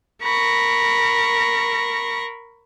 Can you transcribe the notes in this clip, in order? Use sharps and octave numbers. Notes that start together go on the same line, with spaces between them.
A#4 B5 C#6 A#6